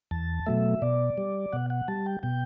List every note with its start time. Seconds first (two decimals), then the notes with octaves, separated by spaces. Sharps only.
0.11 E2 A5
0.46 B2 F#3 A3 E5
0.82 B2 D5
1.18 G3
1.53 B2 F#5
1.70 F#5
1.88 G3 A5
2.06 G5
2.23 B2 G5